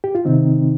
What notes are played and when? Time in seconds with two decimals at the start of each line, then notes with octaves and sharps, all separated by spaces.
0.04 G4
0.15 F4
0.25 C3 D#3 C4 D#4